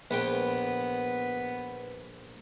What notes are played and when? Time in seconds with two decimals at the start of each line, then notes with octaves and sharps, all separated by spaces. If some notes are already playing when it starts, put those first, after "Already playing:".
0.11 A#1 B3 B4 G5